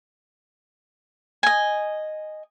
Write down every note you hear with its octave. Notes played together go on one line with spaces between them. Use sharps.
D#5 G#5